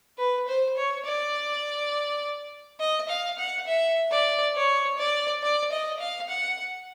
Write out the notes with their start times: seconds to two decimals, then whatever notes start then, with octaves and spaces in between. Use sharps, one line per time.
0.18 B4
0.47 C5
0.77 C#5
1.05 D5
2.80 D#5
3.09 F5
3.38 F#5
3.67 E5
4.11 D5
4.55 C#5
4.98 D5
5.43 D5
5.72 D#5
6.00 F5
6.29 F#5